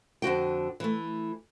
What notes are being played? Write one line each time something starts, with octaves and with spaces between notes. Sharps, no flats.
F2 D3 F#4 G5
E3 A3